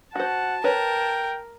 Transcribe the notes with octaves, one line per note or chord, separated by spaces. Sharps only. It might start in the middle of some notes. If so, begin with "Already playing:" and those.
F#4 C5 F#5 A5
A#4 B4 C#5 G5